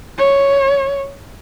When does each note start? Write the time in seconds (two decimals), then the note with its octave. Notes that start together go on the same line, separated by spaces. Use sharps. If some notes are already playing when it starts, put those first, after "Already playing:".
0.18 C#5